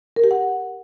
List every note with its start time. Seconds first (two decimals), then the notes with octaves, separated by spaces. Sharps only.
0.16 A#4
0.24 G4
0.31 F#5